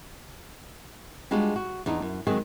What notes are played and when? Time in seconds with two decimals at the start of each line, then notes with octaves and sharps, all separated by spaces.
1.31 G3 G#3 D4 F4 F#4
1.56 F#4
1.86 E2 D4 D#4
2.02 F#2
2.27 D#3 F#3 G#3 C4 G#4